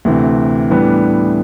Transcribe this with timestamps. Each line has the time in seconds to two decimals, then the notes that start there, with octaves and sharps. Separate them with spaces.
0.05 D2 C3 E3
0.70 A2 E3 G3 B3 D4